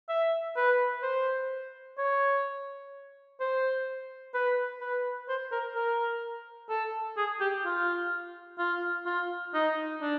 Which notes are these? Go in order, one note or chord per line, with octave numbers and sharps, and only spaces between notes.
E5
B4
C5
C#5
C5
B4
B4
C5
A#4
A#4
A4
G#4
G4
F4
F4
F4
D#4
D4